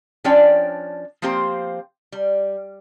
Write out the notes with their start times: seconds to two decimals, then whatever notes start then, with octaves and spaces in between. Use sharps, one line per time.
0.24 F3 C#4 D4 C#5 D5 G5
1.22 F3 A#3 C4 G4 C5
2.12 G3